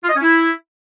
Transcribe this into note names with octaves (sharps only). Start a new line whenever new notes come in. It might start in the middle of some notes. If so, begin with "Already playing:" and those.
F4
D#5
C#4
E4